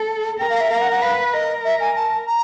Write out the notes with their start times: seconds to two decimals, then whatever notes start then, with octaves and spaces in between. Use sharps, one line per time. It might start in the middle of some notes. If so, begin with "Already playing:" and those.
Already playing: A4
0.39 A#4 G5
0.50 F5
0.60 E5
0.71 A#4 F5
0.81 F#5
0.92 F#5
1.02 B4 F5
1.33 A#4 D#5
1.64 E5
1.80 G#5
1.96 A5
2.27 A#5